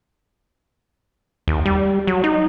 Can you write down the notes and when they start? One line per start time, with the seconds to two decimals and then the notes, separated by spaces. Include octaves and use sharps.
1.48 D#2
1.66 G3
2.07 F#3
2.24 D#4